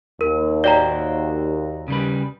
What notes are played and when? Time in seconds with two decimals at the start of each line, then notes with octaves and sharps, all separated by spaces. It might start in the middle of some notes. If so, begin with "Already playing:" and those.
0.21 D#2 A#4
0.64 F#4 C5 D5 G5 A#5
1.88 C#3 G3 B4